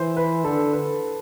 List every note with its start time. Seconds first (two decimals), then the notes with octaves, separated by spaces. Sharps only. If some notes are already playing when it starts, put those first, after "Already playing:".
Already playing: E3 C5
0.17 B4
0.45 D3 A4
0.73 B4